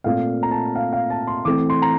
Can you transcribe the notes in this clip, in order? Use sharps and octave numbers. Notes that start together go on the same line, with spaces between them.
A#2 A3 C4 F5
A#5
A5
F5
F5
A5
C6
E3 A3 C4 D6
C6
A#5